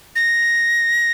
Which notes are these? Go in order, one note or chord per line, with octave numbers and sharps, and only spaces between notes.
A#6